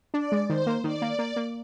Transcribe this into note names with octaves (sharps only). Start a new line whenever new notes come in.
D4 D5
G#3
D#3 C5
A#3
D#3 D5
A#3
A#3
A#3